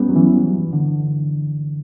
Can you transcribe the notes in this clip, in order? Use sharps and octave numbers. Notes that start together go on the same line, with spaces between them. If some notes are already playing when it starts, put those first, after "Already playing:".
Already playing: G3 B3 C#4
F#3
E3
D3